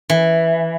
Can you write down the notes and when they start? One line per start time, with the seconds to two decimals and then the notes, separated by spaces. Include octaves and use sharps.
0.10 E3